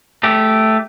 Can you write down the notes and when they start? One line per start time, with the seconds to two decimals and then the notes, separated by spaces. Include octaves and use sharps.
0.24 A3 G4